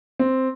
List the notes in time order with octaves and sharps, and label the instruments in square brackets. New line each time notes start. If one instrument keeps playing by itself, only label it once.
[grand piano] C4